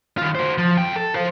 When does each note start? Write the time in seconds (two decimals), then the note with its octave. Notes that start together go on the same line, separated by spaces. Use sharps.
0.18 D#3 F4
0.35 F#4 C5
0.58 F3
0.78 F2 G5
0.96 A4
1.15 C5 F5